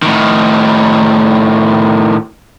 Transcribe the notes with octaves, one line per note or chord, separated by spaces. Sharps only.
A2 D#3